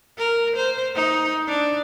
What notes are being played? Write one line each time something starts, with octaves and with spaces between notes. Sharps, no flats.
A#4
C5
D#4
D4